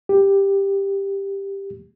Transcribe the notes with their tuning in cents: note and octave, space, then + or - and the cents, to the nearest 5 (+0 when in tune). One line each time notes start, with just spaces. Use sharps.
G4 +10